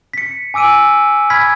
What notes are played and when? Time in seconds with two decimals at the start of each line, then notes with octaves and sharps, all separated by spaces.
0.14 B6 C#7
0.54 G#5 D6 E6 D7 D#7
1.30 B5 F6 G#6 B6